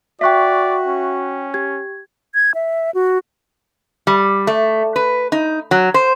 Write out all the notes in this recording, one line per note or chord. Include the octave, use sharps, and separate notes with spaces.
F#4 D5 E5 G5 C#6 F#6 B6
C#4
G4 G#6
G#6
E5
F#4
G3
A3
B4
D#4
F#3
C5